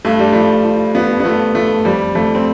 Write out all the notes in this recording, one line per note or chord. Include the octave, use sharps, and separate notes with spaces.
G2 A3
G3
F3 A3
F3
F3 B3
B3
F3 A3
F3 A3
F2 G3
F2 A3
C4